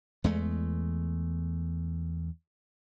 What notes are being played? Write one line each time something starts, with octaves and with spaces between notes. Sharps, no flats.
E2 G#3 A3